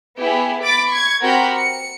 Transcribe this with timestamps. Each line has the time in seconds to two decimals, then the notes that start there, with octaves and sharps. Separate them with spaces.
0.19 B3 E4 G4 G#4
0.62 B5 D6 A6 D7
0.91 C#6 G#6
1.21 C4 F#4 G4 A#4 B5 G6
1.54 C#7